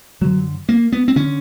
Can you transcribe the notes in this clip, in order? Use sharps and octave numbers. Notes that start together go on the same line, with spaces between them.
F#2 D3 F#3
A#3
B3
C4
D3 C#4